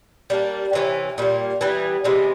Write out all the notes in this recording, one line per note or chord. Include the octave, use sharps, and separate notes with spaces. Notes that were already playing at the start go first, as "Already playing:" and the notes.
G3 A#3 D4
C3 E3 A3 C#4
A#2 G3 A#3
E3 G3 B3
C3 E3 G#3 B3